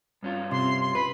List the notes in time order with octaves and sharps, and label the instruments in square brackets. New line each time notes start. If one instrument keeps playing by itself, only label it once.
[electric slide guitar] G2 C#4 F4
[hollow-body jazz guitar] C3 [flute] C6
[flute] C6
[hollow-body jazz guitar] B4 [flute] B5